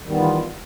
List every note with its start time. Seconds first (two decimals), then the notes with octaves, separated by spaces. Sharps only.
0.01 D#3
0.06 G3
0.10 B3
0.14 E3
0.19 F4